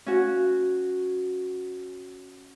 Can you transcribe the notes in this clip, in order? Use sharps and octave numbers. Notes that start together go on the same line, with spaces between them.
C#4 F#4